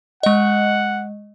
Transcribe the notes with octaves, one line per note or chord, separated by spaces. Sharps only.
G#3 D#5 F#5